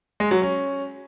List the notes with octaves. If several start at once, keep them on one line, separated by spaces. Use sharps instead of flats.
G#3
F#3
C#4